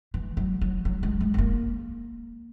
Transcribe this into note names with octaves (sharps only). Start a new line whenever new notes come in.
E3
F#3
F#3
F#3
G#3
G#3
B3
A#3